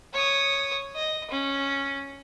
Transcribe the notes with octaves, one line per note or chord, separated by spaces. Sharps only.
C#5 D#6
D#5
C#4